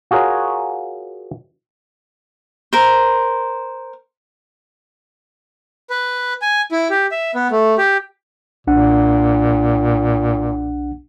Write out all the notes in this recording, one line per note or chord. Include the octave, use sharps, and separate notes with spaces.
F4 F#4 G#4 A#4 C#5
A#4 C5
B4
G#5
E4
G4
E5
B3
A3
G4
B1 A#2 D4 F#5